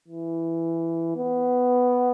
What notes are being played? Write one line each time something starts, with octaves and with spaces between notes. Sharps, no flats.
E3
B3